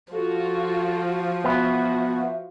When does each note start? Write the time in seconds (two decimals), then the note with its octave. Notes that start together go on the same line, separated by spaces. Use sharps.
0.13 F3 F4 F#4 A4
1.44 B3 F#4 E5